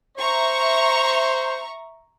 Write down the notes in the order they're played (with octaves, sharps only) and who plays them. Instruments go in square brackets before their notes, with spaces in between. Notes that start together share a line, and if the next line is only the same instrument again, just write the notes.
[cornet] C5 [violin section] E5 A#5 C#6